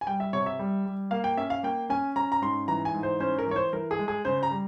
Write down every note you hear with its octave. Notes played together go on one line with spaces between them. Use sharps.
G#5
G3 G5
E5
C3 C#5
E5
G3
G3
A#3 F5
G5
C#4 E5
F5
A#3 G5
C#4 G#5
C#4 A#5
A#5
G#2 C6
E3 A#5
G#5
G#2
C5
C#4 C5
A#4
E3 C#5
C5
E3 A#4
G#4
G#3
G#4
C#3 C5
A#5
G3